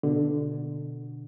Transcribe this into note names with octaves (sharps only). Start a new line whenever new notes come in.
B2 D3